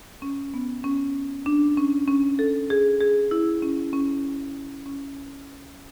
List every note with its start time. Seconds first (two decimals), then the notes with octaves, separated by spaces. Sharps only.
0.22 C#4
0.54 B3
0.84 C#4
1.46 D4
1.77 C#4
2.08 C#4
2.39 A4
2.70 G#4
3.00 G#4
3.31 E4
3.62 C#4
3.93 C#4
4.86 C#4